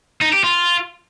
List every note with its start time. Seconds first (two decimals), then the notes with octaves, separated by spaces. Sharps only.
0.22 D#4
0.33 G4
0.44 F4